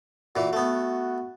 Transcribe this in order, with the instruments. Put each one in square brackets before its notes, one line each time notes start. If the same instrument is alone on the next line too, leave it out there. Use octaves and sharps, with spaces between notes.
[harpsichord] A#2 E3 [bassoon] F#4
[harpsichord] A3 B3